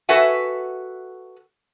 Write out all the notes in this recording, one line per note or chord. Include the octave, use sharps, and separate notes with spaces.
F#4 A4 B4 E5 F#5 G#5